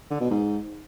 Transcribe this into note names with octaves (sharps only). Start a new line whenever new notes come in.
D3
B2
G#2